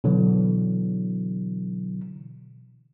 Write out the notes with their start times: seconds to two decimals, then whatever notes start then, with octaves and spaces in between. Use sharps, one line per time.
0.04 B2 D3 E3 F#3